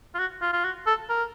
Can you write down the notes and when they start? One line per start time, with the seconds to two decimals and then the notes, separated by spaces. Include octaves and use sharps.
0.15 F4
0.19 F#4
0.41 F4
0.53 F4
0.64 F#4
0.87 A4
1.09 A#4